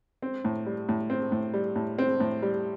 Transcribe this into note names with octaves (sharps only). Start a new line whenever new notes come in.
C4
A2
G3
A2
C4
A2
G3
A2
C4
A2
G3